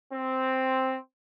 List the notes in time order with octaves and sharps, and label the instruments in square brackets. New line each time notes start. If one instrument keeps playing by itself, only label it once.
[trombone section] C4